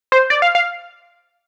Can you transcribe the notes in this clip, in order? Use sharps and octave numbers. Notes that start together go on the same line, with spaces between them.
C5
D5
F5
F5